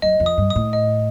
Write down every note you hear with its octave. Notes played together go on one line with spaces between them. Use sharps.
F#2 D#5
F2
D#6
G2
D#6
A2
D#5